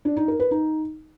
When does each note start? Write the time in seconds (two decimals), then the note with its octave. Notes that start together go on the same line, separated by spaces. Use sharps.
0.05 D4
0.17 D#4
0.28 A#4
0.40 B4
0.51 D#4